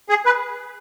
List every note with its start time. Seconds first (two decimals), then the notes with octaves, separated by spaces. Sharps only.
0.09 G#4
0.26 B4